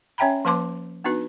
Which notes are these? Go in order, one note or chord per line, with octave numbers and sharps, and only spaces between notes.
C#4 C#5 E5 G5 A#5 B5
F3 A#3 B4 A5 C6 D6
B3 D4 D#4 F#4 B4